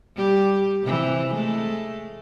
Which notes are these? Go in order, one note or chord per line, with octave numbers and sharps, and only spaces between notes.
G3 G4
C3 E3
G#3 A3